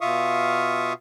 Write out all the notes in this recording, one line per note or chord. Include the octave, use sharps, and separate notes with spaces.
B2 F4 E5 F5 C#6 D#6